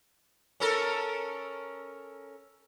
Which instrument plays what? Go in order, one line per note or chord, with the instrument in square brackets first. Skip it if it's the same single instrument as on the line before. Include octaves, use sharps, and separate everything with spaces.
[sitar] C#4 A4 A#4